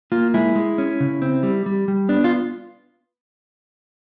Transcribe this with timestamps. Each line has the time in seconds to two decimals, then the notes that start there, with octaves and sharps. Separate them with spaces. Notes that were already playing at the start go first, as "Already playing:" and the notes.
0.12 A#3 F4
0.34 G#3 E4
0.56 G#3
0.78 C#4
1.00 C#3
1.22 C4
1.43 G3
1.66 G3
1.88 G3
2.09 B3 D4
2.24 F4